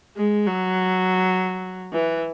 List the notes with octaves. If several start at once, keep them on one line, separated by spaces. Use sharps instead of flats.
G#3
F#3
E3